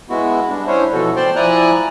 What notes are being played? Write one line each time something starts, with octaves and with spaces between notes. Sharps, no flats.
G#3 B3 E4 F#4
G3 D4
C#4 D4 E4 C5 C#5
B2 E3 F3 F#4 A4
C5 D5 G5 A5 C6
F3 E4 D5 G#5 A#5 F#6